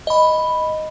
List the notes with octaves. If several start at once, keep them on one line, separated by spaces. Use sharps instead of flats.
D#5 B5